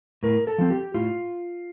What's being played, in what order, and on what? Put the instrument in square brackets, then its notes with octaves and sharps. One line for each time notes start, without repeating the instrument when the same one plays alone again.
[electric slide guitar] A2 A#4
A4
F3 C4
G4
A2 F4